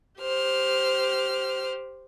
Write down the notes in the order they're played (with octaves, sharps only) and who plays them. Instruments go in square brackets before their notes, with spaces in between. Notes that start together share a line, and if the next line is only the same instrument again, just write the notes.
[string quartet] G4 C5 F6